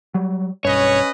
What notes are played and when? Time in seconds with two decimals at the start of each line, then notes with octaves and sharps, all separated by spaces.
0.14 F#3 G3
0.65 B1 G2 C#4 B4 C#5 D#5